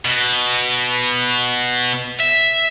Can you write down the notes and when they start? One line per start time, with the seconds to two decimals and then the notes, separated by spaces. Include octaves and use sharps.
0.05 B2
2.19 E5